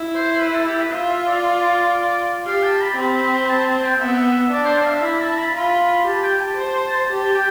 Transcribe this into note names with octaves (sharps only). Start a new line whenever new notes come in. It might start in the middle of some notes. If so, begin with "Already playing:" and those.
Already playing: E4
C5
C5
B4
A4
G4
B4
F4 E5
E5
D5
G4 F5
A5
B5
C4 B5
A5
A5
G5
B3 E5
D4 D5
C5
D5
F5
E5
E4 B5
A5
B5
F4 B5
G4 A5
G5
A5
C5
G4 A5
G5